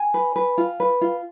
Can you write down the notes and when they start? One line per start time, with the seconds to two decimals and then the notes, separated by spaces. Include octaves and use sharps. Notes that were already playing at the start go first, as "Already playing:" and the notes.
Already playing: G#5
0.14 B4
0.36 B4
0.58 F4
0.80 B4
1.01 F4